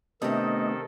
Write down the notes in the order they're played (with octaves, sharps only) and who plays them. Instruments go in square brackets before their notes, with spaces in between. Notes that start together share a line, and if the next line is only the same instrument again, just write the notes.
[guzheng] C3 G4 [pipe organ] D#3 A4 [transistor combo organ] A3 B3 D4 [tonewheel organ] D#5